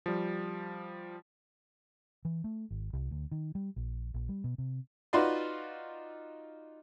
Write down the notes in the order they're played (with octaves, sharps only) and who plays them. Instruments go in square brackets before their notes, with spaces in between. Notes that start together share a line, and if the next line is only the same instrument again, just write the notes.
[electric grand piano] F3 G3
[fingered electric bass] E3
A3
G#1
C2
D2
D#3
G3
A#1
A#1
G3
B2
C3
[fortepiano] D#4 F4 F#4 B4 D5 C6